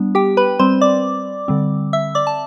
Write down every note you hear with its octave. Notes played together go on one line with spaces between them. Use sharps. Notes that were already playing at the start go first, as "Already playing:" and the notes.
Already playing: G3 B3 D4
G4 G5
B4 B5
G3 C4 C5 C6
D5 D6
D3 G3 C4
E5 E6
D5 D6
A5